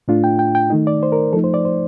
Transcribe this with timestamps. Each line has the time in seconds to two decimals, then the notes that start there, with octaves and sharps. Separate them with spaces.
0.08 A2 A3 D4 F4
0.24 G5
0.39 G5
0.55 G5
0.70 D#3 A3 D#4
0.87 D5
1.03 C5
1.12 A#4
1.33 F3 A3 D#4 A4
1.44 C5
1.54 D5
1.65 C5